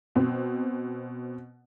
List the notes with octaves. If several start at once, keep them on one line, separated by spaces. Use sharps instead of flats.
B2 C4